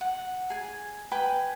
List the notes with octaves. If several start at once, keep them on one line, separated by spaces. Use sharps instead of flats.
F#5
G#4 G#5
B4 G5 G#5 B5